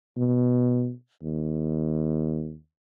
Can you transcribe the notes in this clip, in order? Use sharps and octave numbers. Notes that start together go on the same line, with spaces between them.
B2
D#2